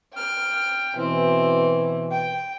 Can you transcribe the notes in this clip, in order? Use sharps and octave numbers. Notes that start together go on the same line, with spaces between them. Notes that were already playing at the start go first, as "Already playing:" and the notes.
G5 F6
B2 E3 C4
G5